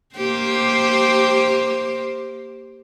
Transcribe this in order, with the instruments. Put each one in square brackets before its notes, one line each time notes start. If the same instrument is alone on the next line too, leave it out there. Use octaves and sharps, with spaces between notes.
[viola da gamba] A#3 G4 C5